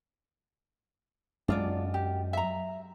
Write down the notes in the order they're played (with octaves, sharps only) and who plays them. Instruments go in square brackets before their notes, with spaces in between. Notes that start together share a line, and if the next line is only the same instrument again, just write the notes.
[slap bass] F#2 G#3 [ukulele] D4 F4 D5
[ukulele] G4
E5 A#5